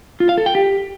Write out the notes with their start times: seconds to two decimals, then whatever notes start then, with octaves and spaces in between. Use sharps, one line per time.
0.20 F4
0.29 F5
0.38 A4
0.46 G5
0.55 G4